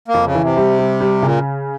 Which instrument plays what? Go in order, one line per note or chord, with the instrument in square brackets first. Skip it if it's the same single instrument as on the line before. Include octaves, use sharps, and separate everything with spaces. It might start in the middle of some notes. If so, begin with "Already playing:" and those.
[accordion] A#3
[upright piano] F2
[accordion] C#3
[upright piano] E3
[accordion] C3
[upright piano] G3
G3
G3
[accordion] A#2 [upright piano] C#3